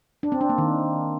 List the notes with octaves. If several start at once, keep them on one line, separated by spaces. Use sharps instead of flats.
D4
C4
D4
A#3
D#3